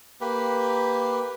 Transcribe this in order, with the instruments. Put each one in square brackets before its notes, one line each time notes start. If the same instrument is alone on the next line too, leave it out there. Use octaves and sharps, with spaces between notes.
[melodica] A#3 G4 B4